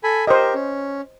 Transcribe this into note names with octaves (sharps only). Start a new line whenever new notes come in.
A4 G#5 B5
G4 A#4 C5 D#5
C#4